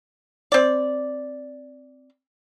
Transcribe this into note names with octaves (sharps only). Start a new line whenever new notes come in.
C4 D5